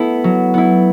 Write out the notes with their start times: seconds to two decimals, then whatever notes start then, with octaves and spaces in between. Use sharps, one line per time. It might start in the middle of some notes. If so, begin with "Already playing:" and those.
Already playing: A3 B3 E4
0.24 F#3
0.54 B3 E4